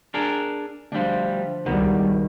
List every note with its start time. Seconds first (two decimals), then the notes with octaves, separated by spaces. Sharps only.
0.14 D4 G#4 A#4
0.92 D2 F3 G3 D4
1.66 C#2 B2 D#3 G3